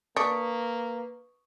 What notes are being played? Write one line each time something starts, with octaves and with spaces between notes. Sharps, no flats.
A#3 D4 B4 C#6 D#6 C#7